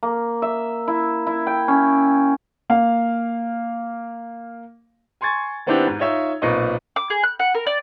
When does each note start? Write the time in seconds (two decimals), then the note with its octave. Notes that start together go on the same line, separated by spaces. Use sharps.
0.03 A#3
0.42 E5
0.88 E4
1.27 E4
1.47 G5
1.68 C#4
2.70 A#3 F5
5.21 G#5 C6 C#6 G#6 A6
5.66 D#3 B3 C4 D4 E4 G4
5.87 G#2
5.99 D#4 F4 C#5 E5
6.42 B1 A#2 C4 B4 D#5 C#6
6.96 D6
7.10 G#4
7.23 F#6
7.40 F#5
7.54 A#4
7.67 D5